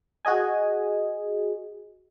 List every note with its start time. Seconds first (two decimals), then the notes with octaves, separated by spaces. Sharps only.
0.25 F#4 G#4 D#5 G#5